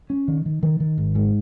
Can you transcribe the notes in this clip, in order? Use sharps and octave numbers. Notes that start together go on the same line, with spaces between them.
C#4
D#3
D#3
D#3
D#3
G#1
G#2